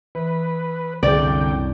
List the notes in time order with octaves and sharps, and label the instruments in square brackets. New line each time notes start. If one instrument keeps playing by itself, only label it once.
[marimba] E3 [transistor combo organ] B4
[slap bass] C2 F#2 [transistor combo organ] D3 G5 [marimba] G3 G#4 [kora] D5